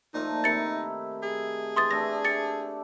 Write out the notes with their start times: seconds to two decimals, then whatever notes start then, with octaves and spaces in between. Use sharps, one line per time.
0.14 A#2 F3 A3 D#4
0.44 C3 D#3 E4 A6 C#7
1.22 G#4
1.76 E3 C6 D#6 A6
1.91 A3 D4 A4 A#6
2.25 G4 A6 C#7